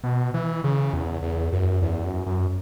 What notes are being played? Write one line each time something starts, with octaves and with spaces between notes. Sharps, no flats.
B2
E3
C#3
E2
E2
F#2
E2
F#2
F#2